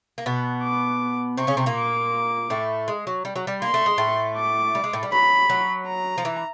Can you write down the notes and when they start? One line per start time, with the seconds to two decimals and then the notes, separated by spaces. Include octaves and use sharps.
0.18 A#3
0.26 B2 B3
0.63 D6
1.37 C3 C4 C#6
1.47 C#3 C#4
1.57 C3 C4
1.66 A#2 A#3
1.75 D6
2.50 A2 A3
2.88 G#3
3.07 F#3
3.25 G3
3.36 F#3
3.47 G3
3.62 A#3 C6
3.74 A3
3.86 G#3
3.98 A2 A3
4.37 D6
4.75 G3
4.84 G#3
4.93 A2 A3
5.03 G3
5.12 F#3 B5
5.49 F#3
5.87 A#5
6.18 F3
6.25 E3